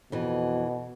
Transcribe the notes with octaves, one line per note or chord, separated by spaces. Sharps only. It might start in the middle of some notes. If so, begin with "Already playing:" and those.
F2 B2 E3